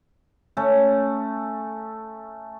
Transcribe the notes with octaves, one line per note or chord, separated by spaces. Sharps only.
A3 C#4